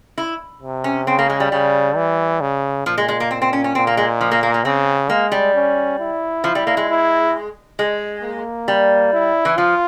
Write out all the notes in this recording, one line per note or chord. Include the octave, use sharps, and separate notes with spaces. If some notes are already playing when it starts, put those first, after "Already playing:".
E4
C3
C#4
C#3 C4
A#3
G#3
G3
C#3 G3
E3
C#3
A#2 F3
G#3
G#3
A#3
C4
C4
C#4
C#4
A#2 C4
A#3
G#3
F3
A#3
A#3
A#3
C#3 C4
G#3 A#3
G3
C#4
E4
F3
G3
A#3
G#3
E4
G#3
A#3
G3
E4
E3
F3 F4